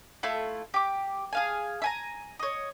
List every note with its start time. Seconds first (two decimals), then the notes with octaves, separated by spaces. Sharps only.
0.23 A3 E4 F4
0.74 G4 D6
1.33 G#4 F5 G#5
1.82 E5 G#5 A#5
2.39 C#5 D#5